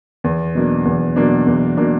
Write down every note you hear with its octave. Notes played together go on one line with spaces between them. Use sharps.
E2
B2 F#3 A#3 D4
E2
B2 F#3 A#3 D4
E2
B2 F#3 A#3 D4